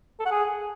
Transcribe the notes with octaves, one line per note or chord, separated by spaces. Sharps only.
A4
F#5
G#4